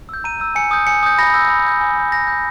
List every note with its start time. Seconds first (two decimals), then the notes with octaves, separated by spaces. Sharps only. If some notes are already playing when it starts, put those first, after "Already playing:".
0.09 E6 G6
0.24 A#5 D#7
0.40 E6 G6
0.55 G#5 C#7
0.71 D#6 G6
0.87 G#5 C#7
1.03 D#6 G6
1.18 B5 A#6
1.34 E6 G6
1.50 B5
1.65 E6 G6
1.81 G#5
1.96 D#6 G6
2.12 G#5 A#6
2.27 D#6 G6